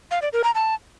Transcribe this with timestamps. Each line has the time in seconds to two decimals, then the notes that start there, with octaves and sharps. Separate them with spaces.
0.11 F5
0.22 D5
0.33 A#4
0.44 A#5
0.55 A5